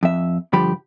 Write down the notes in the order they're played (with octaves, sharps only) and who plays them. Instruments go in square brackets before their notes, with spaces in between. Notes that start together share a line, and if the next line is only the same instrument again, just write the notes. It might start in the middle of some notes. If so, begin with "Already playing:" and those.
[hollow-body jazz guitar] F2 E5
G2 D3 F3 G4 B5